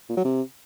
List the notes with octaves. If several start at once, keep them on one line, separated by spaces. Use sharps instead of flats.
A#2
F#3
C3